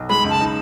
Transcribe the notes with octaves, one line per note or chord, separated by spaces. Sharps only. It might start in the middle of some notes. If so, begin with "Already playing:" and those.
Already playing: B1
G#3 B5
C#2
A5
D#4